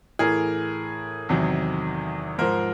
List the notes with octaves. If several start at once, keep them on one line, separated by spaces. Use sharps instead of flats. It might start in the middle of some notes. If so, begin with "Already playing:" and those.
A2 E3 G#4 A#4
E2 C3 D#3 F#3
G#2 F3 A#4 C5